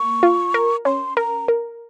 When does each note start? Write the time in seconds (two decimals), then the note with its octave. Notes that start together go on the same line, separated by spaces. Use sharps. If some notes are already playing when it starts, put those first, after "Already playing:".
Already playing: A#3 C#6
0.23 F4
0.54 A#4
0.85 C#4 C6
1.17 A#4 A#5
1.48 A#4